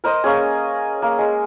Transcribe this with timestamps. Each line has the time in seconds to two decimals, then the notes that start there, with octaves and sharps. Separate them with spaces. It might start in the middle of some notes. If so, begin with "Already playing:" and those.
0.04 A#4 C5 D#5
0.24 A#3 C#4 G#4
1.02 A#3
1.19 G#3